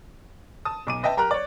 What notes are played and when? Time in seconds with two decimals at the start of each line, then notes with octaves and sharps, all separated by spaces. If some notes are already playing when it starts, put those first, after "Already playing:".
0.65 A5 D#6
0.87 B1 D6 D#7
1.03 B4 D#5 E5 G5 A5
1.17 G4 A#4 G5 A#5 F#6
1.31 C#5 D5